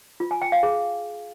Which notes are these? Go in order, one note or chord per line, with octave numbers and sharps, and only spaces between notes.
F4
G#5
G5
F5
G#4